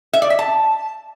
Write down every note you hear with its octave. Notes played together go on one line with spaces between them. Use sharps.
E5
D5
E5
A5